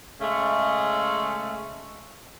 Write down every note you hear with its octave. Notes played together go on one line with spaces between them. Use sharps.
C#3 G#3 A3